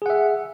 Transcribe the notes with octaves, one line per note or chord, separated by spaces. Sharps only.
G#4 E5 F#5